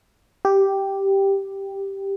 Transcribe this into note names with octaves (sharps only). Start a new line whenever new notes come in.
G4